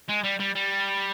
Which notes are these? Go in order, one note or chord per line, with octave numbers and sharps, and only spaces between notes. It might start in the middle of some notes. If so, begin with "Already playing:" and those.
G#3
G3
G3
G3